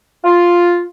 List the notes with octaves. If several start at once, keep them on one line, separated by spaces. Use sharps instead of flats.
F4